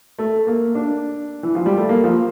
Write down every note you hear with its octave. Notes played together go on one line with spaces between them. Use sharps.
A3
A#3
D4
E3
F3
G3
A3
A#3
F3